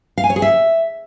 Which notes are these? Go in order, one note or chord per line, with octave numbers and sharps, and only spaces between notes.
F5
G#5
C#5
G#4
E5